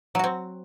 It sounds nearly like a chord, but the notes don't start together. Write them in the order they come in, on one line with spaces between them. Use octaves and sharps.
F#3 F#4 C4